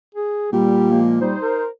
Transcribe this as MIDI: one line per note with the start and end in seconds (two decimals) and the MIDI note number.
0.15 0.50 68
0.53 1.32 46
0.53 0.87 55
0.53 0.99 67
0.90 1.20 53
0.90 1.20 56
0.90 1.20 58
1.20 1.36 55
1.20 1.64 63
1.20 1.64 72
1.42 1.68 70